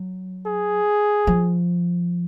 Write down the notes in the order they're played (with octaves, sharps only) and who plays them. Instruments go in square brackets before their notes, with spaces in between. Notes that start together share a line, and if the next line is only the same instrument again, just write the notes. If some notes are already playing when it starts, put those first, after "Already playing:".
Already playing: [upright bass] F#3
[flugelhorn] G#4
[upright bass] F3